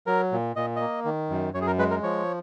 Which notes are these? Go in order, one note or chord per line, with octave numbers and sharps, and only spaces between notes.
F#3 A#4
A#2
A#2 D#5
A#3 D#5
D#3
F#2
F#2 C#5
G#4
A#4
G#3 B4
A#4
F3 C#5